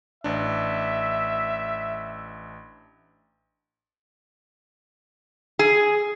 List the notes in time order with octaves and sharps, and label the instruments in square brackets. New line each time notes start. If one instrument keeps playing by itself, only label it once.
[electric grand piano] A1 D4 [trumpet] E5
[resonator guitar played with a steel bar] G#4